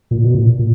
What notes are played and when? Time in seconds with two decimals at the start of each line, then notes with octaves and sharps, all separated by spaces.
0.11 A#2
0.24 B2
0.35 A#2
0.59 A#2